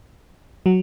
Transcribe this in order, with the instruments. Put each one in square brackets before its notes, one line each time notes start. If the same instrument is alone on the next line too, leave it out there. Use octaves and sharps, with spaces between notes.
[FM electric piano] F#3